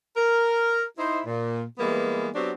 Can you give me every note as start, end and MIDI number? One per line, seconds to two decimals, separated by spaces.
0.16 0.83 70
0.97 1.20 63
0.97 1.20 64
0.97 1.20 72
1.26 1.62 46
1.78 2.29 52
1.78 2.29 55
1.78 2.29 56
1.78 2.29 58
1.78 2.29 59
2.35 2.51 54
2.35 2.51 59
2.35 2.51 60
2.35 2.51 62
2.35 2.51 66
2.35 2.51 67